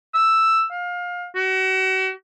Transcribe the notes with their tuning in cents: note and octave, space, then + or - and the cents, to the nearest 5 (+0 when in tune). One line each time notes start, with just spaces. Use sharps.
E6 +5
F5 +25
F#4 +35